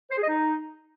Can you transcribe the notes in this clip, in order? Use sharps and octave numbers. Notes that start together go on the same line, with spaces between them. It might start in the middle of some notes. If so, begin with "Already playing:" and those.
C5
G#4
D#5
D#4